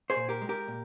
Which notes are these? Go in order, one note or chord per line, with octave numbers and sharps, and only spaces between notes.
G#4 C5
A#2
G4 A#4
G#3
G4 A#4
A#2